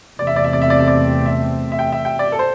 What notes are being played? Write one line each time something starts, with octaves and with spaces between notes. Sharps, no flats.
E2 C3 A3 C4 D5
E5
D5
E5
D5
E5
D5
E5
D5
E5
E5
G5
E5
G5
D5
A4
C5